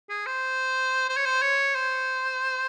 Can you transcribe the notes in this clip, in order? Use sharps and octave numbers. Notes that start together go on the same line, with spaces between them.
G#4
C5
C5
C#5
C5
C#5
C5